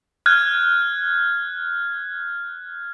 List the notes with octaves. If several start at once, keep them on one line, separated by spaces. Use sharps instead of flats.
F6 F#6 G#6